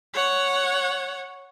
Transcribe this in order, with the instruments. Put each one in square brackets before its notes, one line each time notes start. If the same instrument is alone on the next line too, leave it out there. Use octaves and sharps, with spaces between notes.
[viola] C#5 F#5